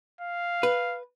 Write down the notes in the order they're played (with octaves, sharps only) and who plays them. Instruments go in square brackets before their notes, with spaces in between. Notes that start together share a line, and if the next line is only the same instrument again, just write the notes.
[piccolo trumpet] F5
[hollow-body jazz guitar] B4